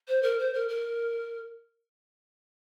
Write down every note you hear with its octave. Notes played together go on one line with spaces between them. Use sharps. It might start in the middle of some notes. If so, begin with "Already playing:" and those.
C5
A#4
C5
A#4
A#4